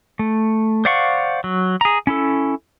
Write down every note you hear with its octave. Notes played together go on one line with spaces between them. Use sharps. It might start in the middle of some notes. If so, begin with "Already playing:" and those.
A3
C5 D5 F5 F#5 C#6
F#3
G#4 A#5
C#4 E4 A4